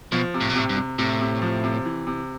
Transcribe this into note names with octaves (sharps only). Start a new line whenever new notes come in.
B2 F3
C3
A2
B2
A2 C3
G2
C3
A2 C3
C3
F3
C3
E3
C3